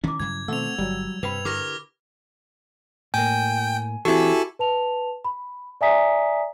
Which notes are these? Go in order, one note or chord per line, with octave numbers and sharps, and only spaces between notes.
D#3 C#4 E4 D6
G2 C#3 F#3 G#6
B2 D#3 F3 A3 C4 F#5 E6 F7
G1 F#3 G3
G2 C3 B4 G5 B5 F7
D3 E4 G4 A#4 D6 F6 A#6
A2 A#3 G5 G#5
E3 C4 E4 F#4 G4 A4 G#5
B4 A5 F7
B5
D5 E5 G#5 A#5 D#6 B6